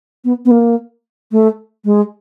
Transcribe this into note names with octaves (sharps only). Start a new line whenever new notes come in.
B3
B3
A#3
A3
G#3